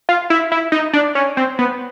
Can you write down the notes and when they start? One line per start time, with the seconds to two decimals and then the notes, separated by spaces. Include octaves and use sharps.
0.09 F4
0.30 E4
0.52 E4
0.72 D#4
0.93 D4
1.15 C#4
1.37 C4
1.59 B3